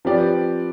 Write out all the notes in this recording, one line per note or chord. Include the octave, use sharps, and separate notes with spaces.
F3 C4 G4 B4 D5